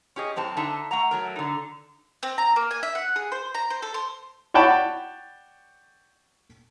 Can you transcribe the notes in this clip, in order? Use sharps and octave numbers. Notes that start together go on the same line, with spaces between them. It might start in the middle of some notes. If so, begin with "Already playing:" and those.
C#4 G4 G#4 D#5
F#2 A2 C4 A5
D3 D#4 E5 A5
A3 F#5 A#5
F#3 A3 A#4
D3 D#4
C4
A#5
A#3
G#5
E5
F#5
G#4
C5
A#5
C5
A4
C5
C#5 D5 F#5 G5 A5 B5